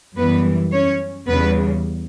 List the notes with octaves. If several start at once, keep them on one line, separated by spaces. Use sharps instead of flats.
F#2 E3 G3 B3 B4
C#4 C#5
E2 C#3 G3 B3 B4